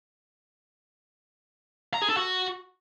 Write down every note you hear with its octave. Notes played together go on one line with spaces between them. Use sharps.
A#5
G#4
A4
F#4